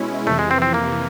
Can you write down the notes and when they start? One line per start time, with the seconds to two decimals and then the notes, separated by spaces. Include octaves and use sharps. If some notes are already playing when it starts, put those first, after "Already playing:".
Already playing: B2 G#3 C#4 E4
0.27 F2 C3 E3 A3
0.39 G#3
0.51 C4
0.62 C4
0.74 A#3